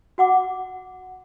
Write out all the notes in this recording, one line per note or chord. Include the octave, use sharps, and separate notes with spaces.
F#4 F#5 D6